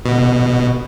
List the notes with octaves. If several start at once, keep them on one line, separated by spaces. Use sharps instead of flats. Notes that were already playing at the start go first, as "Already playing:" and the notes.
B2